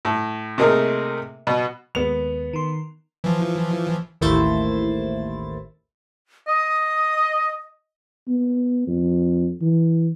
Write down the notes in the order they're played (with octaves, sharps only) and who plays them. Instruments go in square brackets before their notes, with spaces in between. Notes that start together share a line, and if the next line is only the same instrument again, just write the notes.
[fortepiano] A2
C3 A3 A#3 D#4 G#4 A#4
B2 B3
[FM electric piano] D#2 G#3 [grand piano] B3 F7
[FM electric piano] D#3 C6
[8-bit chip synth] E3 F3
[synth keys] A1 D#2 A3 E4 C5 A6
[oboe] D#5 [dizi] D#6
[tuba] B3
F2
E3